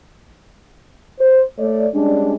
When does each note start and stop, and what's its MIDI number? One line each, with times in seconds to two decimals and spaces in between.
1.20 1.43 72
1.58 1.87 57
1.58 1.87 73
1.58 1.87 74
1.93 2.36 55
1.93 2.36 56
1.93 2.36 61
1.93 2.36 62